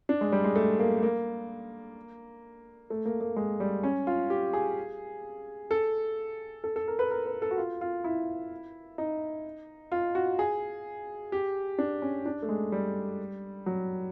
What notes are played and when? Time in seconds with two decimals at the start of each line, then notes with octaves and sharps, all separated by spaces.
0.09 D4
0.21 G#3
0.32 G3
0.44 G#3
0.56 A3
0.79 A#3
1.03 A#3
2.90 A3
3.05 A#3
3.21 A#3
3.36 G#3
3.60 G3
3.83 C#4
4.07 F4
4.30 G4
4.53 G#4
5.71 A4
6.64 A4
6.76 A4
6.88 A#4
6.99 B4
7.11 A#4
7.26 B4
7.42 A4
7.51 F#4
7.58 F4
7.81 F4
8.04 E4
8.98 D#4
9.92 F4
10.15 F#4
10.39 G#4
11.32 G4
11.79 D4
12.02 C#4
12.26 D4
12.42 A3
12.49 G#3
12.72 G3
13.66 F#3